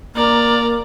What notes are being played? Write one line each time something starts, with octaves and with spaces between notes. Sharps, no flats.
A#3 D5 A#5